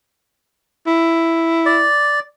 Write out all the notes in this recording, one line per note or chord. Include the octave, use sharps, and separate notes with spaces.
E4
D5